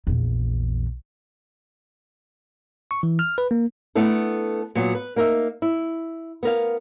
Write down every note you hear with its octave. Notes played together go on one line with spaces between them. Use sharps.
A#1 E2
C#6
E3
F6
B4
A#3
A3 B3 D4 E4 A4
A#2 F#3 B3
B4
A#3 D#4 A#4 D5 E5
E4
B3 A#4 F5